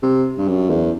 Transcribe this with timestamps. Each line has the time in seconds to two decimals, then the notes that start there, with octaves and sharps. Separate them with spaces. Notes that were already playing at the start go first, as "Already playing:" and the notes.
0.02 C3
0.38 G2
0.48 F#2
0.70 E2